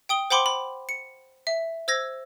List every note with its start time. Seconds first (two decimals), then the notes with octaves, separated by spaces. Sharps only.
0.09 G5 D#6 G7
0.30 C5 F#5 G5 B5 C6 D6
0.46 B5
0.89 C#7
1.47 E5
1.88 C5 E6 G#6 A#6